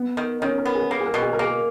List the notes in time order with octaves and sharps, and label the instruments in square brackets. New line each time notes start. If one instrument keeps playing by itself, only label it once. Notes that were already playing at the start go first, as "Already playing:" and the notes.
Already playing: [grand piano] B3
[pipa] D#3
[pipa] D#3 [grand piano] C#4
[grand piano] A#4
[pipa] B3
[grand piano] G#4
[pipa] A#3 [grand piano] A#4
[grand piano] G#4
A#4
[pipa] B2
[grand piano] G#4
A#4
[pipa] A#3 [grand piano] G#4